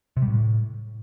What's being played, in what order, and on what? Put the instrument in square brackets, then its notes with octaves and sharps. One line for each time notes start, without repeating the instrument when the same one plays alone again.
[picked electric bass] C3
G3
A2